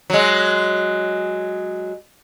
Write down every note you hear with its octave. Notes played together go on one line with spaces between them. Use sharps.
F#3 G#3